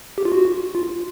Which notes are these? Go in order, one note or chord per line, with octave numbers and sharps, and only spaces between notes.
G4
F4
F#4
F4